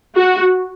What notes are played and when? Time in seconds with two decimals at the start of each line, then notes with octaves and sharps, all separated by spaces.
0.17 F#4